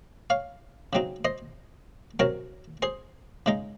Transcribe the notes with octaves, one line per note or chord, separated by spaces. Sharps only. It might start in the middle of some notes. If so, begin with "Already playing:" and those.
C#5 F5
C#3 F#3 C4 D#4
C5 D#5
C3 F#3 C#4 A#4 C#5
G#4 C5
C#3 G#3 D#4